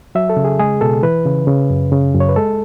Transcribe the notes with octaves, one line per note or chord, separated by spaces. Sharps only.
F#3 E5
A4
C#3
G#4
G#3 G#4
B2 A4
E3 B4
C#3
C#3
F#2
C#3
F#2
C#5
B4
G#3 A4